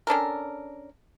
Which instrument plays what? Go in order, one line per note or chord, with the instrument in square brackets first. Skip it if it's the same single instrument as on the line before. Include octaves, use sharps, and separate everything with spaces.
[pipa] C#4 D4 A4 A#4